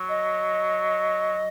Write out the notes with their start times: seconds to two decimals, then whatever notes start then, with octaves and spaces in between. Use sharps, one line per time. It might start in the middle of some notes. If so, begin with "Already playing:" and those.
Already playing: F#3
0.08 D#5